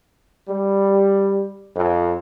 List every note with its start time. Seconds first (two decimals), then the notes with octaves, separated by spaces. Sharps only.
0.49 G3
1.75 F2